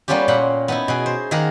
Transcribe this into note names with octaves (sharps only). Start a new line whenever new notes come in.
G3 A#3 B3 C#4 F4 G4
A#2 A#3 F#5 B5
B3 D#4 E4
B2 G#4
C5
D#3 A#3 G#4 A#4 F#5